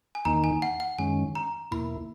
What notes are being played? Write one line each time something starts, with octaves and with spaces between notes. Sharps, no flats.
G#5
E2 D#3 A#3 D#4 A#5
G#5
F#5
F#5
F#2 D#3 G#3 C#4 G#5
A#5
E2 B2 A#3 E4 B5